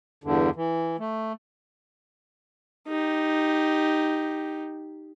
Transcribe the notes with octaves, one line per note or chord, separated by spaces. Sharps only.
E2 G2 D3
E3
A3
D#4 G4